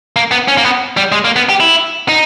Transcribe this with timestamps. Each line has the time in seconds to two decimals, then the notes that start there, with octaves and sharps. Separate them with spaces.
0.16 A#3
0.31 B3
0.48 C#4
0.58 A#3
0.64 B3
0.97 G3
1.12 G#3
1.25 A#3
1.36 B3
1.49 G4
1.60 E4
2.09 D#4